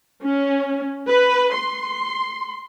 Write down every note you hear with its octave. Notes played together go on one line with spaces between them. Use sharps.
C#4
B4
C6